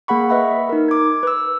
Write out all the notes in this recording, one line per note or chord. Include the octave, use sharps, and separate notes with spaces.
A#3 G#4 F#5 B5 C#6
B4 D#5 E5 F#5 B5
D#4 A#4
D6 G#6
B4 E6